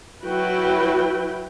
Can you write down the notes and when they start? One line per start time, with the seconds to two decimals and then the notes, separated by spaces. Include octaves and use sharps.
0.23 F#3 E4 F#4 B4 G5